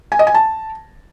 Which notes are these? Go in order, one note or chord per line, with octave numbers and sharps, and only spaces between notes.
G#5
D#5
G#5
A5